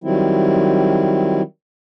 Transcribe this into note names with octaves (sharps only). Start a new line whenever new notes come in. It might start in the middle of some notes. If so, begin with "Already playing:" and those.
D#3 F#3 G3 C4 E4